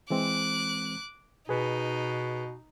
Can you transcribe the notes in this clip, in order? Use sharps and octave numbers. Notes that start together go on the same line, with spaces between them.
E3 G#3 C4 D6 F#6
B2 D#4 G#4 B4